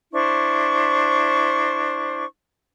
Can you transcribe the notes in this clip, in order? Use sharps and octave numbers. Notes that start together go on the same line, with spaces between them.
D4 E4 C5 C#6